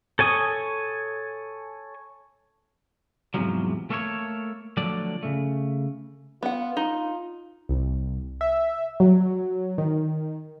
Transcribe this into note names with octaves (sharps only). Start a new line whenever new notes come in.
A4 C#5 G#5 C#6 D#6
E2 G#2 C3 F3 F#3
A3 A#3 A4 C5 C#5
D3 F3 F#3 A3 D5
C#3 A3
B3 F4 F#5
D#4
C2
E5
F#3
D#3